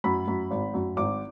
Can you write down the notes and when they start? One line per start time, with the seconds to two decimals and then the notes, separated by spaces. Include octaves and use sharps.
0.04 F#2 B5
0.28 F#2
0.51 G#1
0.74 F#2
0.97 G#1 D6